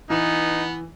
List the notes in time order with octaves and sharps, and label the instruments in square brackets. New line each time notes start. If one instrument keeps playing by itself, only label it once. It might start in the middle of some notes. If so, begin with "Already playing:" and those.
[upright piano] E3 [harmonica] B3 [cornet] D#4